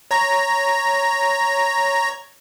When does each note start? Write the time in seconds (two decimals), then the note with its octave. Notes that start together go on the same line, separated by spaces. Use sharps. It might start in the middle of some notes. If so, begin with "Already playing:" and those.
0.11 C#5 A#5